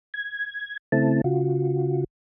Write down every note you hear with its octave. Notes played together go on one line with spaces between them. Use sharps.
G#6
C#3 A3 C4 E4 A5
C#3 F4 F#4